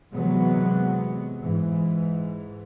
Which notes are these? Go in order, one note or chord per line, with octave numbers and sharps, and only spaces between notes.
C3 E3 F#3 G#3 B3
G#2 E3